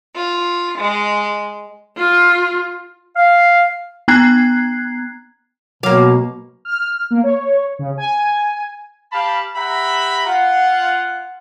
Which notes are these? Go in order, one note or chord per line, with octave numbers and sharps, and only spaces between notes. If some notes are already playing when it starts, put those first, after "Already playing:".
F4
G#3
F4
F5
B3 A#5 F#6 G#6 C7
B2 F#3 A#3 C#5 F5 D6
F6
A#3
C#5
C#3
G#5
G4 F5 A5 B5
G4 E5 F#5 A#5 B5
F4 F#5